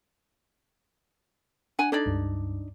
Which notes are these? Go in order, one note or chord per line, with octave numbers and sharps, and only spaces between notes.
D4 F#5 G#5
D4 D#4 A4 D5 G#6
C#2 G2